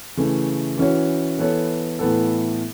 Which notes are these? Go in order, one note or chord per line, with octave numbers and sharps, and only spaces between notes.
C#3 E3 A3
E3 C#4 F#4 C#5
E3 B3 A4 C#5
A2 E3 B3 A4